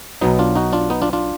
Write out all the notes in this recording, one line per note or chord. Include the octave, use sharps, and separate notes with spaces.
B1 B2 F#3 B3 D#4
D4 F4
D#4 F#4
D4 F4
B3 D#4
D4 F4
D4 F4